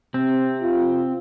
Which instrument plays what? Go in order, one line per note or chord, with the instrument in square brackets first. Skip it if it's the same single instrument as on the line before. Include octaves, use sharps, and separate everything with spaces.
[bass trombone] C3 [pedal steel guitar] C4
[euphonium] F4